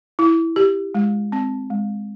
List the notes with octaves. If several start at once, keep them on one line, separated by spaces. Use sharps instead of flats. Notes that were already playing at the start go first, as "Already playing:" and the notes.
E4
G4
G#3
C4
G#3